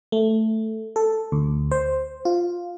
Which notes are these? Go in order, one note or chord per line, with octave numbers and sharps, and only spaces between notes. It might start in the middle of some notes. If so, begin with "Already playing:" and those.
A3
A4
D2
C5
F4